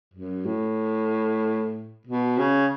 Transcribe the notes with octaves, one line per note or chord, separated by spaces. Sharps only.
F#2
A2
B2
C#3